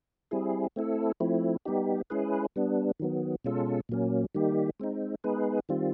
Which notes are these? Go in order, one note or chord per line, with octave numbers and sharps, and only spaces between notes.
G3 C4 E4 G#4
A3 C4 E4 A4
F3 A3 C4 E4
G3 B3 D#4 G4
G#3 C#4 E4 G#4 B4
G3 B3 D4
D#3 F#3 B3
B2 G#3 C#4 F4 A4
A#2 F#3 A#3 C#4
D#3 G3 A#3 D#4 G4
G#3 C4 D#4
G#3 B3 D#4 G#4 B4
D#3 G3 C4 F4